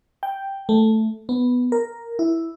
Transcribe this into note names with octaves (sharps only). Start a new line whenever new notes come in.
G5
A3
B3
A#4
E4